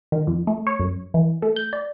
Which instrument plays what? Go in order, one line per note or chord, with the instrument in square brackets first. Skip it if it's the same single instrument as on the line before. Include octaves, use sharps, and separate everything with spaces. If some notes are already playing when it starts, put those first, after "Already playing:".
[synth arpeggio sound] D#3
F2
A3
C#5
F#2
E3
A3
G6
D5